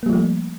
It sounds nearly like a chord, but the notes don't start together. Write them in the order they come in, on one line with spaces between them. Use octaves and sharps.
A#3 G3 F3 A3